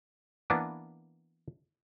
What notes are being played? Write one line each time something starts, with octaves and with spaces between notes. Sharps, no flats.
E3 A#3 B3 D4 B4